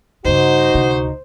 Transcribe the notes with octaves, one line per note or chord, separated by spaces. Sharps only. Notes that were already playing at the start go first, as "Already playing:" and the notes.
G2 C#3 D#4 F#4 C5
D1 C3